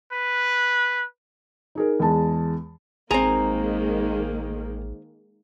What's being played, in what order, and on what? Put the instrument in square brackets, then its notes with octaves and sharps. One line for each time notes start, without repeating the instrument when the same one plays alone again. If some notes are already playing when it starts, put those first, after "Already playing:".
[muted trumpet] B4
[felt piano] D#4 G#4 A#4
E2 G#3 A5
[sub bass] A1 [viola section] D#3 G#3 A#3 [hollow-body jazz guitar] C4 G#4 [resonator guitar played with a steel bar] A#5